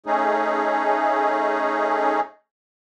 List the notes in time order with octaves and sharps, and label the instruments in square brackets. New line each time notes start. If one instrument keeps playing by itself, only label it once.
[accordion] A3 C#4 D#4 G#4